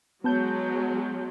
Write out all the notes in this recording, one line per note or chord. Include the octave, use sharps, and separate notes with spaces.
F#3 G#3 B3 A5 G6